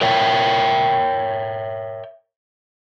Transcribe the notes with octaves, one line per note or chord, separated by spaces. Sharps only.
A#4 C#5 E5 G5